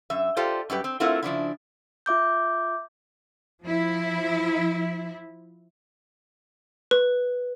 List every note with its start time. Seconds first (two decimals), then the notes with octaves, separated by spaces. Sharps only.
0.10 F#2 E5
0.37 F4 G4 A4 C5 D5
0.70 F#2 G3 G4 B4
0.84 C4
1.00 A3 C4 E4 F4 A#4 F#5
1.23 C#3 F3 D4 E4
2.06 F4 E5 D6 G6
3.63 F3 E4
6.91 B4